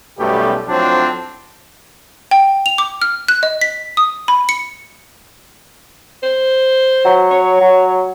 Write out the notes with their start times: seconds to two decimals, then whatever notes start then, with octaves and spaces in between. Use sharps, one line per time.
0.19 B1 F#2 B2 G3 A3 G4
0.67 A2 F3 F#3 C4 D4
2.31 G5
2.66 F7
2.78 D6
3.02 F6
3.28 F#6
3.43 D#5
3.61 B6
3.97 D#6
4.28 B5
4.49 C#7
6.23 C5
7.05 F#3
7.31 C#5
7.61 F#3